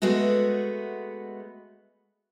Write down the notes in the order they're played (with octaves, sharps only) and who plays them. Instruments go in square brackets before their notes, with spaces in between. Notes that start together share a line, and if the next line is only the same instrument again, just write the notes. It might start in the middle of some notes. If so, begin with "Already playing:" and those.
[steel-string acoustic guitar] G#3 A3 B3 F#4